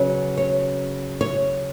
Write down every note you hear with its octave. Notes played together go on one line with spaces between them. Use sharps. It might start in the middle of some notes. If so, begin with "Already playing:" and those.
Already playing: C#3 F#3 B3
C#5
C#5